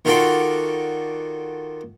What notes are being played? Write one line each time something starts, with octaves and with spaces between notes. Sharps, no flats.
D#3 F4 F#4 A4 D5 C6